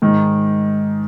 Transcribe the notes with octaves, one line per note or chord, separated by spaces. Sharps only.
G#2 D#3